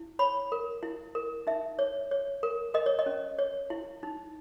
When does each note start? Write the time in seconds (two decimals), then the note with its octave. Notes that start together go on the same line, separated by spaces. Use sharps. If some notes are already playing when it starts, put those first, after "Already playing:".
Already playing: E4
0.19 C#5 B5
0.52 A#4
0.83 E4
1.15 A#4
1.47 D#4 E5
1.79 C#5
2.11 C#5
2.43 A#4
2.74 A#4 D#5
2.86 C#5
2.99 D#5
3.06 C#4
3.39 C#5
3.70 E4
4.03 D#4